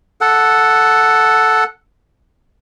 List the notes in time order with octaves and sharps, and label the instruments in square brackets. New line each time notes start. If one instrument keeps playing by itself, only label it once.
[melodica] A4 F#5